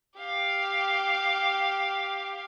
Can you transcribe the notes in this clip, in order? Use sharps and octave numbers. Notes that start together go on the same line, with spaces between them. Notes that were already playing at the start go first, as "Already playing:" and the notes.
G4 F5